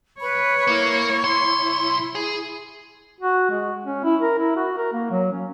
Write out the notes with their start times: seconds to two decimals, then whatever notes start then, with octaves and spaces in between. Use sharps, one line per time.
0.20 B4 C#5 B5
0.67 A#3 E4 A#4
1.24 B1 C6
2.15 G#4
3.20 F#4
3.50 G#3
3.85 C#4
4.04 E4
4.21 A#4
4.39 E4
4.56 F#4
4.77 A#4
4.93 A#3
5.10 F#3
5.32 C#4